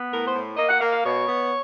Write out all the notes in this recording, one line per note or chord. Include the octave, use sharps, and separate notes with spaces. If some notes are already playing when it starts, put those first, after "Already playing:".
Already playing: B3
A2 A#4
C5
A2
A#3 D#5
F#5
A#3 F5
F5
B2 C#5
B3